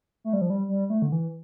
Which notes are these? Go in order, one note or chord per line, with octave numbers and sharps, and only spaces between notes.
A3
G3
F3
G3
G3
A3
D3
E3